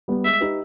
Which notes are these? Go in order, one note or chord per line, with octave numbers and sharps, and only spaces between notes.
G3 B3
G#3 E5
D#4 G4 B4